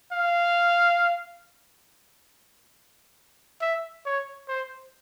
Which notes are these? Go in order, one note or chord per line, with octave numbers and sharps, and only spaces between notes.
F5
E5
C#5
C5